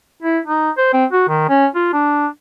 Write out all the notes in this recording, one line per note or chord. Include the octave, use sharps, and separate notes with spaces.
E4
D#4
C5
C4
F#4
D#3
C#4
F4
D4